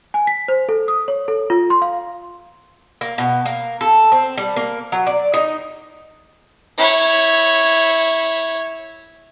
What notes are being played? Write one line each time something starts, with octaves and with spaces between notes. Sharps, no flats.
G#5
B6
C5
A4
D#6
C#5
A4
F4
C6
F5
A#3
B2
A#3
A4
C4
G3
A#3
F#3
D5
D#4
E4 C#5